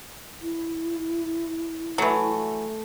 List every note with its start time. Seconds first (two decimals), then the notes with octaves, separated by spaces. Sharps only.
0.42 E4
1.98 E3 F#3 A3